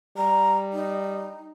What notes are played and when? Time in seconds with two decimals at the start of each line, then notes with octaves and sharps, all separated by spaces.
0.17 G3 A#5
0.73 D#4